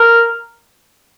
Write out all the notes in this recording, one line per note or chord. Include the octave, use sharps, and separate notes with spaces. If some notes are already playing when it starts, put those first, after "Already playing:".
Already playing: A#4